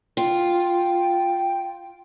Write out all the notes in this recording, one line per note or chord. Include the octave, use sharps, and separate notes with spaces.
F4 G5